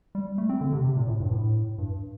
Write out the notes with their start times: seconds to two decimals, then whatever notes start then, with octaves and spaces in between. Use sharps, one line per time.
0.15 G3
0.38 A3
0.49 C4
0.61 D3
0.72 C3
0.85 C3
0.97 A#2
1.08 A2
1.20 G2
1.31 A2
1.78 G2